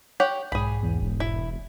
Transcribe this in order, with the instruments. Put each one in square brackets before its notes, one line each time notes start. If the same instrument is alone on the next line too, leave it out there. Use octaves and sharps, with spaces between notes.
[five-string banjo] G4 C#5 F#5 [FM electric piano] G5
[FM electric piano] B1 G#2 [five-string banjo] G#4 B5
[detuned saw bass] E2
E1
[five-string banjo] E4